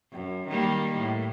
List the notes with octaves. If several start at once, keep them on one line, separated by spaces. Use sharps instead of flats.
F#2
D#3 G3 A#3
A2